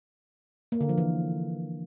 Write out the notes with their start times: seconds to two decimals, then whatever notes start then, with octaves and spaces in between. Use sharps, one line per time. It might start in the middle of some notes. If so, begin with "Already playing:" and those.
0.72 A#3
0.81 D3
0.89 F3
0.98 E3